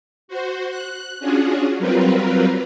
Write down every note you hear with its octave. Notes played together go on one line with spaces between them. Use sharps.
F#4 C5
F#6
C#4 D4 F4 F#4 G#4
F#3 G3 C4 F4 A#4 B4